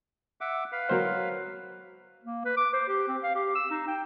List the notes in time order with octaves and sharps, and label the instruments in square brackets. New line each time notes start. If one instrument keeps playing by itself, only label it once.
[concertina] E5 F#5 D6
B4 F5
[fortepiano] F#3 A#4 C5
[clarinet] A#3
B4
D6
C5
G4
C4
F5
G4
E6
D#4
G5